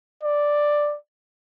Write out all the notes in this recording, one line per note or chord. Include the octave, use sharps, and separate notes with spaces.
D5